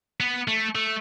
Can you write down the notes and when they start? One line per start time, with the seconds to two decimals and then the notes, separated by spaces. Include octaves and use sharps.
0.20 B3
0.48 A3
0.75 A3